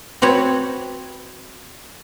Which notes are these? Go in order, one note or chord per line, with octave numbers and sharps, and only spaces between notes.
C4 F#4 B4 C#5